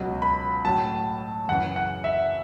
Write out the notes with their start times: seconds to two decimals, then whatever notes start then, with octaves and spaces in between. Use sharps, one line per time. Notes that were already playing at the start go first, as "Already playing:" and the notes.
Already playing: C#2 B2 F#3
0.22 B5
0.65 A2 F#3 A5
1.48 F#2 C#3 E3 F#5
1.76 F#5
2.04 E5